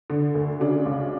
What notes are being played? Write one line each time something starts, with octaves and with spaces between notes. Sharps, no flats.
D3
D2
C#3 D4 F#4
C#2